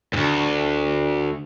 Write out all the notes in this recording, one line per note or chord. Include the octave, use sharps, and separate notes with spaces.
D2 G#2